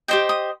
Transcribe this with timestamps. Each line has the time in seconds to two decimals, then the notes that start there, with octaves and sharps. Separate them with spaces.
0.08 G4 C5 D#5 G5
0.29 D#6